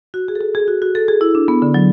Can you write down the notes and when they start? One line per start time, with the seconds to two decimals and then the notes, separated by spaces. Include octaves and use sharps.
0.14 F#4
0.28 G#4
0.35 A4
0.41 G#4
0.55 G#4
0.68 F#4
0.82 F#4
0.95 A4
1.08 G#4
1.21 E4
1.35 D4
1.48 B3
1.62 D3
1.74 F#3